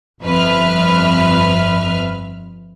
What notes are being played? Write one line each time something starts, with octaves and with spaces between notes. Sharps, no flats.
G1 F2 B4 E5 F6